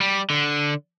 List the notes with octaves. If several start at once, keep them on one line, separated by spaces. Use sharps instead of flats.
G3
D3